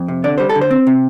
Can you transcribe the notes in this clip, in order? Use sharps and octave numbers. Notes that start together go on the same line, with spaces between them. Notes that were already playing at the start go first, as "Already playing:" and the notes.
Already playing: F2
C3
D3 D5
G3 C5
A4
D3
C5
C4
C3